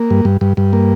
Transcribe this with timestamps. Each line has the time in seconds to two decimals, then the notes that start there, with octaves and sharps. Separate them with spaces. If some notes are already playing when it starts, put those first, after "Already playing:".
Already playing: A#3
0.10 G2
0.25 G2
0.41 G2
0.57 G2
0.73 A#3